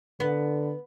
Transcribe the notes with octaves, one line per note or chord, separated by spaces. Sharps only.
D3 B3